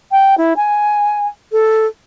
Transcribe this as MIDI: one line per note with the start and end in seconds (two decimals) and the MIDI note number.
0.11 0.35 79
0.38 0.53 64
0.57 1.27 80
1.52 1.86 69